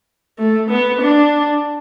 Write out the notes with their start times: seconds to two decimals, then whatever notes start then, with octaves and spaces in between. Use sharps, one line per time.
0.38 A3
0.70 B3
1.01 D4